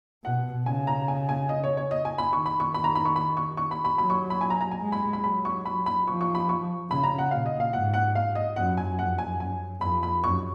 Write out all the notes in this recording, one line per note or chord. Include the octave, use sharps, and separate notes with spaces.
B2 F#5
C#3 G#5
A#5
G#5
G#5
D#5
C#5
C#5
D#5
G#5
B5
D#3 C#6
B5
C#6
D#3 B5
A#5
B5
C#6
B5
C#6
C#6
B5
B5
F#3 B5
C#6
B5
G#5
A#5
A#5
G#5
G#3
B5
B5
F#3 B5
C#6
B5
B5
F3 C#6
C#6
B5
C#6
C#3 B5
A#5
F#5
A#2 F5
D#5
F5
G#2 F#5
F#5
F5
D#5
F#2 F#5
G#5
F2 F#5
G#5
F#2 G#5
F2 B5
B5
F#2 C#6